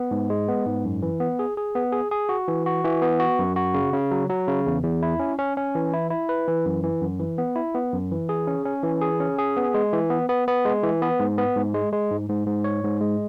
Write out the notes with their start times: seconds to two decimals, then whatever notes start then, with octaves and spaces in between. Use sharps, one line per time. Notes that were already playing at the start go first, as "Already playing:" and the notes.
Already playing: B3
0.11 G#2
0.30 G#3
0.48 B3
0.66 G#2
0.85 F#2
1.02 E3
1.20 B3
1.39 G#4
1.57 G#4
1.75 B3
1.93 G#4
2.11 G#4
2.29 F#4
2.48 E3
2.66 F#4
2.84 E3
3.02 B3
3.20 F#4
3.39 F#2
3.56 F#4
3.74 C#3
3.93 C#3
4.11 F#3
4.30 F#3
4.48 C#3
4.66 E2
4.83 E2
5.03 E4
5.20 C#4
5.39 C#4
5.57 C#4
5.75 E3
5.93 E4
6.10 E4
6.29 B4
6.48 E3
6.66 F#2
6.83 E3
7.01 F#2
7.19 E3
7.38 B3
7.56 E4
7.75 B3
7.93 F#2
8.11 E3
8.29 G#4
8.47 C#4
8.65 C#4
8.83 E3
9.01 G#4
9.20 C#4
9.39 G#4
9.57 B3
9.74 G#3
9.93 E3
10.10 B3
10.29 B3
10.48 B3
10.65 G#3
10.83 E3
11.02 B3
11.20 G#2
11.38 B3
11.57 G#2
11.74 G#3
11.92 G#3
12.11 G#2
12.29 G#2
12.47 G#2
12.64 C#5
12.84 G#2
13.01 G#3